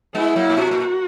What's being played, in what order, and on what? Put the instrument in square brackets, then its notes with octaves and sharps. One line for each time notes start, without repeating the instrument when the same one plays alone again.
[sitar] G#3 B3 [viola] E4
[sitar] F#3 A#3
A#2
[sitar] B2 [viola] F#4
[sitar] A#2